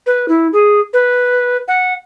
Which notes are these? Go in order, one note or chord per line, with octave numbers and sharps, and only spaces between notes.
B4
E4
G#4
B4
F#5